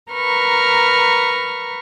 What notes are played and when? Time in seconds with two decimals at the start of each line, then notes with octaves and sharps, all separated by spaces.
0.10 A#4 B4 A#5 C#6 F6